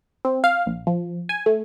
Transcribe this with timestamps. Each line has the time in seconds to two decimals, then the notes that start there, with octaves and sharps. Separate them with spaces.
0.25 C4
0.44 F5
0.66 A#1
0.87 F3
1.29 G#5
1.46 A3